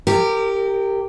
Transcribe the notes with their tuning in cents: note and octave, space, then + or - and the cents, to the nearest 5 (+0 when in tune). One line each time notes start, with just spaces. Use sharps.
G4 +0 A#4 -25